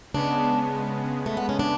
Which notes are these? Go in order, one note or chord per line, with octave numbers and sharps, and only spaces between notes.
C#3 G#3 B3 D4
A3
B3
C#4
D4